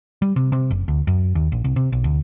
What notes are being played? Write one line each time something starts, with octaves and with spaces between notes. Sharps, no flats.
G3
C3
C3
F#1
D2
F#2
D#2
A#1
C2
C3
B1
D2